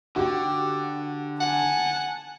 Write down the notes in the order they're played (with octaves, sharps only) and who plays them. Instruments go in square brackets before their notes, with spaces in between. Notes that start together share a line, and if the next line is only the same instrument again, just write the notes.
[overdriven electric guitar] D3 [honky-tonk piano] F#4 G4 G5
[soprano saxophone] F#5 [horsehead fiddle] G#5 A5